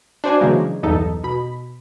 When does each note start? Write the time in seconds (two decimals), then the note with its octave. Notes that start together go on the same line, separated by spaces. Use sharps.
0.24 D4 F#4 C5 D5 G#5
0.41 C#3 E3 F#3 G#3 A#3
0.83 B1 E2 G2 B3 D#4 A4
1.24 B2 B5